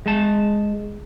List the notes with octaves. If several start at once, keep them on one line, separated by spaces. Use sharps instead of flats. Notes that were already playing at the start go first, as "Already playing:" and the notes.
G#3 A5